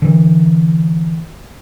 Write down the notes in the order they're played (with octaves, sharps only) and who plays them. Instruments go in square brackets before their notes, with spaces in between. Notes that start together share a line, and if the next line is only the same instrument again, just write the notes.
[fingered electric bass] D3 E3